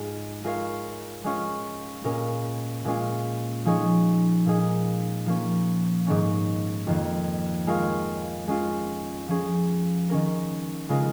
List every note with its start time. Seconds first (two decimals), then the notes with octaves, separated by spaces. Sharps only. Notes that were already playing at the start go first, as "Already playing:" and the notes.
Already playing: G#2 G#3 F4
0.44 G#3 F4 A#4 C#5 F5
1.24 G#3 C#4 F4 C#5
2.04 A#2 G#3 C#4 A#4
2.85 A#2 G#3 C#4 F4
3.65 F3 G#3 D#4 G#4 C#5
4.46 A#2 A#3 D#4 G#4
5.26 F3 A#3 C#4
6.07 G#2 D#3 C#4
6.87 F2 D#3 A#3
7.67 G#3 F4 A#4 C#5 F5
8.48 G#3 C#4 F4
9.28 F3 C#4 G#4
10.09 D#3 C#4 A#4
10.89 C#3 G#3 F4 A#4